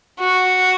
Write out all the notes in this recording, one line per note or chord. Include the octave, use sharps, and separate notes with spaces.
F#4